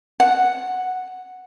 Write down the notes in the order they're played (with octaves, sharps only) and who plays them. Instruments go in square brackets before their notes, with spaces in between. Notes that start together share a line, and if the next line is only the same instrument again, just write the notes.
[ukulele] F#5